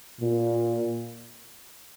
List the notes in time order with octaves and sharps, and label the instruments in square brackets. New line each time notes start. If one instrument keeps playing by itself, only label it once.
[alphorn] A#2